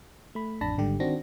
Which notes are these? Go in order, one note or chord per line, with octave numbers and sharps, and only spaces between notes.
A3 B5
A1 F2 D4 A5 B5 A#6
G#1 G#2 D3 G3 G4
D#3 C4 D4 F#4 A#6